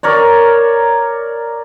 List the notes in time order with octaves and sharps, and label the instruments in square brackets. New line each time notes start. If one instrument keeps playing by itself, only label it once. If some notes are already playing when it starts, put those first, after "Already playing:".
[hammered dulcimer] A#4 C#5 D5